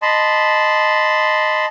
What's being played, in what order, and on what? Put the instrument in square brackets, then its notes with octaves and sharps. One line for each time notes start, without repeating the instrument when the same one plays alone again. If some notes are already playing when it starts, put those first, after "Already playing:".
[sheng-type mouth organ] D#5 A5 B5 C6